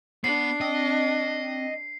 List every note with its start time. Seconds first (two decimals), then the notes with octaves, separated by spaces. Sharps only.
0.24 B3 D4 C7
0.61 C4 D#5